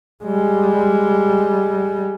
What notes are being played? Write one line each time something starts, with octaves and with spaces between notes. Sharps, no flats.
G3 G#3